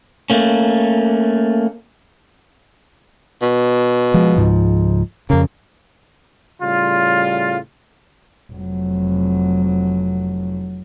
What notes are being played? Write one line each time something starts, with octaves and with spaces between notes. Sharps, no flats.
A3 A#3 C#4
B2
F3 G#3
C#2 G#2 F3
F2 C#3 A#3
A2 C#3 G3 F4
F1 F#3